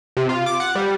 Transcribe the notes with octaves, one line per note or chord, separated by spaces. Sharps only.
C3
F4
D6
F#5
G3